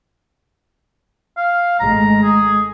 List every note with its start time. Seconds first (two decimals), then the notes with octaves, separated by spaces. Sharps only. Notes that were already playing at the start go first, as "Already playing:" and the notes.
1.37 F5
1.80 G#1 G#3 A3 A#5
2.23 G#4